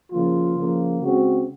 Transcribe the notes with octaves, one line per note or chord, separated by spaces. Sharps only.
C#3 F3 A#3 F4
C#3 F3 A#3
C#3 G#3 C4 F#4